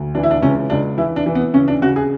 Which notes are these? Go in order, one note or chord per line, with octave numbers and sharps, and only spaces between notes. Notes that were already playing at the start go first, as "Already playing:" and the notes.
Already playing: D2
E3 D4
E4
D4
C#2 C#4
C#2 D4
E3 E4
D4
E3
B3
C#3 C#4
D4
C#3 F#4
G#4